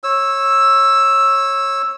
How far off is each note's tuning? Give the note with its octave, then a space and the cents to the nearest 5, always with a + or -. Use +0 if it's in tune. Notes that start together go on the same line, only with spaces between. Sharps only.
C#5 -20 E6 +0